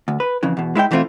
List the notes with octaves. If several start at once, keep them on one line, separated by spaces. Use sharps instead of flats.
D2
B4
F2 C#3 E3
E2 B2
G#3 E4 C#5 G5
B2 E3 A3 C4 E4 F4